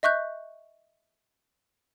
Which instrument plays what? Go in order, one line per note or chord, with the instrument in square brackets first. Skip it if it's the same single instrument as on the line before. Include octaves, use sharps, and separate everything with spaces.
[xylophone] D#5 E5 C#6 F#6 G6